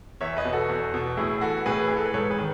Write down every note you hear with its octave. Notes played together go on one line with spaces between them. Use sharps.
E2 C#5 E5
B4 D#5
B2
F#4 A4
E2
B2
A2 E4 G#4
E3 F#4 A4
A2 G#4 B4
E3 G#4
A4
B4
G#2 A4 C#5
G#4 B4
D#3